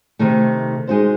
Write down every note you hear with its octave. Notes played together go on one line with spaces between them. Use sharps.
C3 D#3 A3
G#3 D#4 F#4 C5